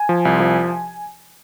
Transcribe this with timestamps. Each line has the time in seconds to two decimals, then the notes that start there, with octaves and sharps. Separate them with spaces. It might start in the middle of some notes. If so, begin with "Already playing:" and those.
Already playing: G#5
0.09 F3
0.25 C2
0.40 F3